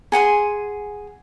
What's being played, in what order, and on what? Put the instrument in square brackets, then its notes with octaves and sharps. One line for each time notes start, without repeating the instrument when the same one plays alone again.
[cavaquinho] G#4 F#5 G#5 C6